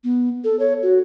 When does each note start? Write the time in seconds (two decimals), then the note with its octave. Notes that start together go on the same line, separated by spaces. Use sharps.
0.04 B3
0.44 A4
0.59 C#5
0.83 F#4